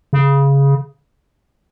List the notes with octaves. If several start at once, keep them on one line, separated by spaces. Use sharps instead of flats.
C#3